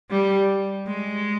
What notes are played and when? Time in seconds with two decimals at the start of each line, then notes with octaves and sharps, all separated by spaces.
0.11 G3
0.87 G#3